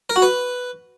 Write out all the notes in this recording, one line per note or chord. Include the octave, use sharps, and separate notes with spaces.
A#4
F#4
B4